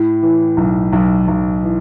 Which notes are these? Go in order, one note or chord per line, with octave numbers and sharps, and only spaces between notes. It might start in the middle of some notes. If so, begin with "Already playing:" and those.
Already playing: A2
E3
B1
B1
B1
E3